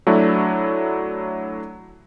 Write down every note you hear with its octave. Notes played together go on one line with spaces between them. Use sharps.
F#3 A3 D4 E4